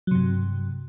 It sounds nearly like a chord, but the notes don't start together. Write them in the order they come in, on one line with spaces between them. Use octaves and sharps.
F#3 C3 G2